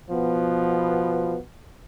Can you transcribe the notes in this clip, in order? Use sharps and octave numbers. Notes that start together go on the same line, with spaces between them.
B2 F3 B3